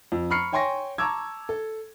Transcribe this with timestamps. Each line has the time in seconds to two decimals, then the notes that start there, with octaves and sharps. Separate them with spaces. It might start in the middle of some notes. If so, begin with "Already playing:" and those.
0.12 F2
0.30 A#5 B5 C#6 F6 C7 C#7
0.53 C#5 G5 G#5 C6 C#6 A#6
0.98 A5 A#5 C#6 D6 E6 G#6
1.49 A4